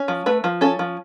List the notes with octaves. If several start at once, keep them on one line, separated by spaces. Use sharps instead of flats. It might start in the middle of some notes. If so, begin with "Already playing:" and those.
Already playing: C#4
F3
A3 B4
F3
C#4 A4
F3